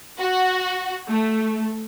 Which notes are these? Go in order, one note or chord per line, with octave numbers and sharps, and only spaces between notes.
F#4
A3